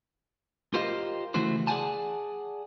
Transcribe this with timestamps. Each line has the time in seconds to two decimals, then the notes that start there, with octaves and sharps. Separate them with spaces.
0.74 F4 G4 A#4 C5 D#5 F5
1.34 C#3 E3 A3 E4 F#4 C5
1.67 G#4 D5 F5 F#5 G#5 A5